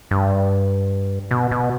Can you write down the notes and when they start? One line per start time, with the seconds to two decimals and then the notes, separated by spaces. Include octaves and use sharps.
0.11 G2
1.31 B2
1.51 B2